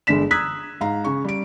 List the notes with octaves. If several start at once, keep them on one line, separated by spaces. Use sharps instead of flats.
G1 G#3 D4 B6 E7
A#5 D#6 E6 F#6 G#6 B6
G#2 F5 A#5
C#3 C#6
G3 D7